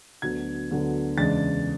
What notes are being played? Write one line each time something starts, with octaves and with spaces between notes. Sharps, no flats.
D2 D3 F#3 B3 G#6
D2 D3 F#3 B3
E2 C#3 G#3 D4 A6